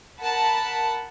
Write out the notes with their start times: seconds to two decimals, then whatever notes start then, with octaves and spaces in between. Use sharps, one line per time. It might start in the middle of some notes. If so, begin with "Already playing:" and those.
0.21 A#4 F#5 A5 B5